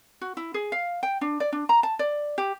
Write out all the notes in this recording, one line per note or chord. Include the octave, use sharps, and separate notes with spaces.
F#4
E4
G#4
F5
G5
D4
D5
D4
A#5
A5
D5
G4